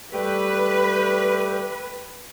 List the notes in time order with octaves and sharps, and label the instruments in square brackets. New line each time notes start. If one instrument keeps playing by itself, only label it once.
[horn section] G3 A3 G4 [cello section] B4